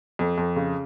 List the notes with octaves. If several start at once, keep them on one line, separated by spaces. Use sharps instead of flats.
F2
F2
C#3